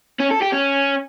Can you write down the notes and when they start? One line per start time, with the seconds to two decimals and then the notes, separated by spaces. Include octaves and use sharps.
0.20 C#4
0.30 A4
0.41 G4
0.52 C#4